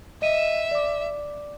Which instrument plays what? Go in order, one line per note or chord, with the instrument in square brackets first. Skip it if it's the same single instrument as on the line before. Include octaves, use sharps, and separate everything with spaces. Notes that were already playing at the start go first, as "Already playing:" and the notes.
[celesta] D#5 D#7 E7 [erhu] E5
[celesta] D5 D6